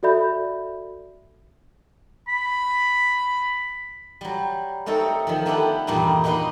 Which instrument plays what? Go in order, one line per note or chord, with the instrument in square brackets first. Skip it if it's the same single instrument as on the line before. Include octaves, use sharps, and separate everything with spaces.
[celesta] F#4 A4 D5 E5 B5 G6
[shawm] B5
[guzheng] F#3 G3
A3 C4 D#4 A4 A#4 C#5
D#3 F3
B3 D4 E4 G4 A4 B4
E2 G2 A#2 D#3 G3 D#4
B2 A#3 D#4 B4 F#5 C6